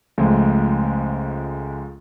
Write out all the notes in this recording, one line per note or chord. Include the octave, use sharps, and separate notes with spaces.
C#2 F3 G#3 A3